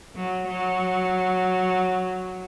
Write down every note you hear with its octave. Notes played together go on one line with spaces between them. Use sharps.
F#3
F#3